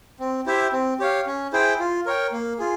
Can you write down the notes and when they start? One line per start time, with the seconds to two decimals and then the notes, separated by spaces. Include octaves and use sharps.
0.20 C4
0.46 E4 G4 C5 E5
0.73 C4
0.99 G4 C#5 F5
1.26 C#4
1.53 E4 G#4 C5 G5
1.79 F4
2.06 A#4 C#5 G5
2.32 A#3
2.59 F4 G#4